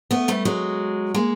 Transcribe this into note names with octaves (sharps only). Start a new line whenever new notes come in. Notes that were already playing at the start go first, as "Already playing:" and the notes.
A3 B3
G3 A3
F#3 G#3
G#3 A#3